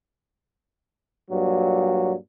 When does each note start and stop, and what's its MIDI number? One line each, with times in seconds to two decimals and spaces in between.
1.31 2.13 43
1.31 2.13 46
1.31 2.13 54